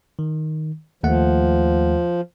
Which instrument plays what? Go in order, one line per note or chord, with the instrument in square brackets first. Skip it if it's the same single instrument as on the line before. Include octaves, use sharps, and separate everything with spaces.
[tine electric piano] D#3
[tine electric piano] D#2 A3 F#5 [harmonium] F3